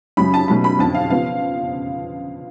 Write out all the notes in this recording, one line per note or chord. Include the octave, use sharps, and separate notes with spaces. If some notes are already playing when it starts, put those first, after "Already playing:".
F#2 C#3 F#3 B5
A5
B2 F#3 A3 C#4 B5
B5
F2 D3 F#3 C#4 A5
F5
C#3 F3 B3 F5